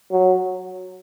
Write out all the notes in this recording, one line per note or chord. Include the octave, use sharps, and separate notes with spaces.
F#3